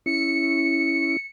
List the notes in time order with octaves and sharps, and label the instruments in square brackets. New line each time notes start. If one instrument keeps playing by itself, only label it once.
[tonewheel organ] C#4 E4 [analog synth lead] C#7